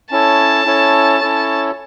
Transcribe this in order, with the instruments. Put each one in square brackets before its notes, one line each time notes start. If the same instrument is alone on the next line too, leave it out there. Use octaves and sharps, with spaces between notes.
[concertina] C#4 E4 A4 C#5 [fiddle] A5
[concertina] C#4 E4 A4 C#5
C#4 E4 A4 C#5